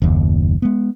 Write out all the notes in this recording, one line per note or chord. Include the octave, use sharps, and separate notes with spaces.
F#1 D#2
G#3 B3